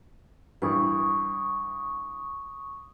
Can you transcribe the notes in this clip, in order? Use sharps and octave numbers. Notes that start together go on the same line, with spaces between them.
G2 E3 C#6 D#6